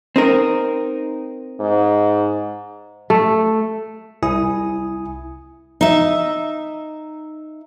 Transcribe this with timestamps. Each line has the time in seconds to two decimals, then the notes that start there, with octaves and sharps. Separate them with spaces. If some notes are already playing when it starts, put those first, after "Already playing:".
0.16 C4 D#4 A#4
1.60 G#2
3.10 A3
4.23 C2 E4 G#5 D#6
5.81 D#4 E5